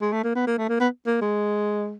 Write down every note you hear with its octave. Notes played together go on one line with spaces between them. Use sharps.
G#3
A3
A#3
B3
A#3
A3
A#3
B3
A#3
G#3